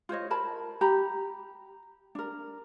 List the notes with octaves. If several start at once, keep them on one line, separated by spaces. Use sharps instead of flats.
F4 C5 C#5 D#5
A#4 A5 B5
G4 A#5 B5
D4 A#4